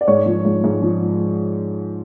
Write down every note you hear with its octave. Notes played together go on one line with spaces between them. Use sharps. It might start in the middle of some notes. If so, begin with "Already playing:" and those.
D5
G#2 C#5
F3
G#2
G#2
F3